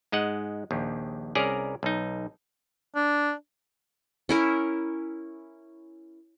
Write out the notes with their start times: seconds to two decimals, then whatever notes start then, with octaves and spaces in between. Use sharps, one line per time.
0.12 G#2 G#3 D#5 F#5
0.71 A#1 D#2
1.35 C2 C#4 G#4 A#4 D5 A#5
1.83 B1 D#4
2.96 D4
4.29 C#4 E4 A#4